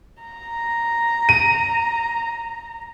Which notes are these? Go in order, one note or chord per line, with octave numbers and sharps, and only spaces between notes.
A#5
D#7